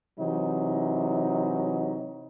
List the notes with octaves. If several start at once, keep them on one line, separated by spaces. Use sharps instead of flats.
C3 E3 F#3 D#4